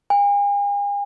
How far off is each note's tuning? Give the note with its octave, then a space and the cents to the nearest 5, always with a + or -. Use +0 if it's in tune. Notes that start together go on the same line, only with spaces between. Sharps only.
G#5 -45